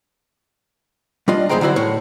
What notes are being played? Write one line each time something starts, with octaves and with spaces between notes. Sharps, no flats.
G3 D4 F4 D#5
E2 G#2 G#3 C5 G5 A#5
D3 F#3 E4 F#4 C5
A2 C#5